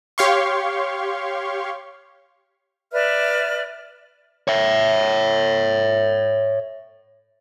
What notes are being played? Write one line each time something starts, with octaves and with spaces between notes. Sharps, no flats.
G4 C#5 F5 C6 C#6
B4 D5 E5 F6
C#5 E5